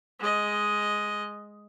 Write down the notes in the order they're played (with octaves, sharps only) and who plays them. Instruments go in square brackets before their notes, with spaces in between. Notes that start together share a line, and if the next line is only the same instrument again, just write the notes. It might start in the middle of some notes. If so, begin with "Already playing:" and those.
[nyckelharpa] G#3 D#5